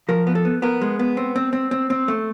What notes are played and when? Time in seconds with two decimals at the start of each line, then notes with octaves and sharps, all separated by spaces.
0.09 F3 A#4
0.27 B3
0.35 A4
0.45 B3
0.62 B3 A#4
0.81 G#3
0.99 B3
1.17 C4
1.36 C4
1.53 C4
1.71 C4
1.90 C4
2.08 A3